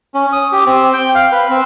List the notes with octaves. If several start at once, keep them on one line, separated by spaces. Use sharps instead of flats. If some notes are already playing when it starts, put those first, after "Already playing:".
C#4
D#6
G4
C4
G5
F5
B4
C4